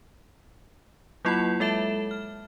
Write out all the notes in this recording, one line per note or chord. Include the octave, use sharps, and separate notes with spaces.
F#3 A#3 E4 F4 F#5 B5
G#3 A4 E5 A5 E7
F6